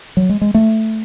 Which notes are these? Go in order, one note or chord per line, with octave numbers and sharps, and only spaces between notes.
F#3
G#3
G#3
A3